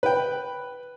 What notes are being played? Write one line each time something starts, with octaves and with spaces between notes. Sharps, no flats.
B4 G5